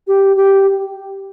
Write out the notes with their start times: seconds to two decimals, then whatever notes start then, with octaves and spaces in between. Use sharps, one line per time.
0.07 G4
0.36 G4